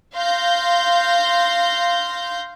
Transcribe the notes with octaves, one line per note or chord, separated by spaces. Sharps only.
F5 C6 G6 A#6